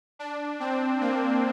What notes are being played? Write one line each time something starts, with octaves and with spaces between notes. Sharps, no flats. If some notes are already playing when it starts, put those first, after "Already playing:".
D4
C4
A#3